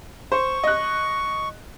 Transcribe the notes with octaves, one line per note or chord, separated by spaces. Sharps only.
C5 C#6
D#5 F#6